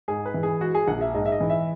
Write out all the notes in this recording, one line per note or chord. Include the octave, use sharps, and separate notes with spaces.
G#2 G#4
B4
E3
G#4
G#3 F#4
G#4
A#1 F#5
E5
G#2 D#5
E5
D#5
E3
E5